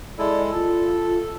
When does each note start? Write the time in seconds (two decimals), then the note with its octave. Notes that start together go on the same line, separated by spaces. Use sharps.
0.18 G#3 E4 A4 D5
0.52 F4 A4